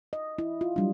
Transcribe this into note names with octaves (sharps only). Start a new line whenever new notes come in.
D#5
E4
F4
F#3 G3 D4